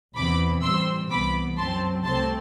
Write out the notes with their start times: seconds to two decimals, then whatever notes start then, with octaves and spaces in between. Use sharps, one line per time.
0.15 E2 C3 E3 B3 B5 D6
0.62 A2 E3 G3 C4 C6 E6
1.10 C2 C3 E3 B3 B5 D6
1.58 F#2 F#3 C4 A5 C6
2.05 C2 C3 F#3 A3 C4 A5 C6